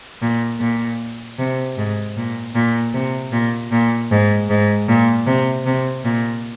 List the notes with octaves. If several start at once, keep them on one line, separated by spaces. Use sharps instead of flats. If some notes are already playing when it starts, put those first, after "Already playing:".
A#2
A#2
C3
G#2
A#2
A#2
C3
A#2
A#2
G#2
G#2
A#2
C3
C3
A#2